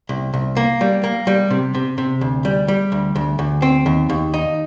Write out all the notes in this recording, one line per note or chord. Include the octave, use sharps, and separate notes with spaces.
C2
C2
A#3
G3
A#3
G3
C3
C3
C3
D2
G3
G3
D2
D2
D2
C4
D#2
D#2
D#4